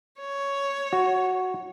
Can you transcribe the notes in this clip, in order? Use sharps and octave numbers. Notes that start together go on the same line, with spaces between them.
C#5
F#4